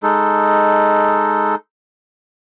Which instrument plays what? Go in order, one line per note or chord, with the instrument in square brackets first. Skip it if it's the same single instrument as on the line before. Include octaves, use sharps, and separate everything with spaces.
[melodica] G#3 D#4 A4